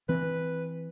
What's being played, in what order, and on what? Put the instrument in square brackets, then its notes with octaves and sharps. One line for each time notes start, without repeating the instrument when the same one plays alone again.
[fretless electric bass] E3 C4 [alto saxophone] B4